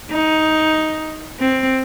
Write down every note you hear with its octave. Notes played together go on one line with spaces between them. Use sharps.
D#4
C4